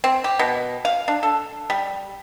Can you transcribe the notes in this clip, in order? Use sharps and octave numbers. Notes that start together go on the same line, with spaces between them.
C4
G4
B2
F5
D4
A4
G3